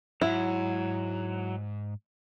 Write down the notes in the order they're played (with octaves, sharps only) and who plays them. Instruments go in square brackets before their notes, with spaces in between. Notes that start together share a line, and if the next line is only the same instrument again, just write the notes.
[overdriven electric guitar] F2 G#2 [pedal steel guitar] F#3 [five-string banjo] E4